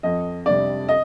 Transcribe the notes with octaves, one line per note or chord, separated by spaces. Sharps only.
F2 D#5
C3 G3 D4 D5
D#5